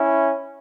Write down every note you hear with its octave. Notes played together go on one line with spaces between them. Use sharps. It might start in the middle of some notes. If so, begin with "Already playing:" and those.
Already playing: C#4 E4